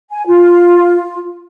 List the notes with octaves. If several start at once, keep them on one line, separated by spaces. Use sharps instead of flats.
G#5
F4